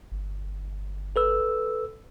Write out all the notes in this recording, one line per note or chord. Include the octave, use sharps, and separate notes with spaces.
G1
A4 B4 E6